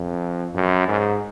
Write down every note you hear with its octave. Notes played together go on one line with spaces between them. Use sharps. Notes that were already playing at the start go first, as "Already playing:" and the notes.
Already playing: F2
F#2
G#2